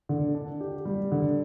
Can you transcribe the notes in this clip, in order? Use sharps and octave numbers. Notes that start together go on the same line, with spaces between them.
D3
D4
G4
G3
D3